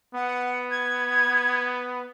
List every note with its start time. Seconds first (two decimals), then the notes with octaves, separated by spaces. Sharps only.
0.14 B3 F#5
0.71 G#6